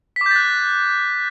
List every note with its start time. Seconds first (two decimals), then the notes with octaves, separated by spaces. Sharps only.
0.16 B6
0.21 D6
0.26 G6
0.31 A6
0.36 F#6